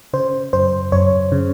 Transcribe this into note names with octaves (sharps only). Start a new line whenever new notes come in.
C#3 C5
F#2 C5
F#2 C#5
C#3